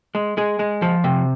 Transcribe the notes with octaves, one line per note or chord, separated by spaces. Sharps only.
G#3
G#3 G#4
G#3
F3
C3